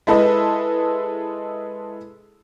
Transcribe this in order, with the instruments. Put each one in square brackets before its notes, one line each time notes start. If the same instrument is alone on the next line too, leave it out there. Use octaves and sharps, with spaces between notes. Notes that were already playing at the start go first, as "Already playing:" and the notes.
[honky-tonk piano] G#3 E4 A4 B4 D#5